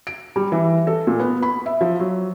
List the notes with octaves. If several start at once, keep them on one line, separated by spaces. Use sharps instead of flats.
D7
G3
E3
A4
A#2
B3
B5
E5
F3
F#3